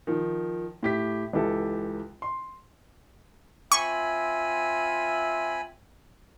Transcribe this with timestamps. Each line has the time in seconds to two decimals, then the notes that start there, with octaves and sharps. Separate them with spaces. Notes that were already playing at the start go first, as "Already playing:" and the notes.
0.07 D#3 F3
0.83 A2 G4 B6
1.33 C#2 E3 G4 A4
2.22 C6
3.72 C4 F4 E5 G#5 B5 C#6